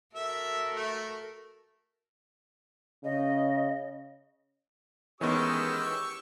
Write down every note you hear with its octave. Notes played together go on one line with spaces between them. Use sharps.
F#4 A4 A#4 E5
A3
C#3 D#5
D#3 E3 G#3 B3 C#4 G4 C#6 E6